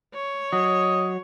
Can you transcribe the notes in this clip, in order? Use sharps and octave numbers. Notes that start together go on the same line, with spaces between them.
C#5
F#3 D#5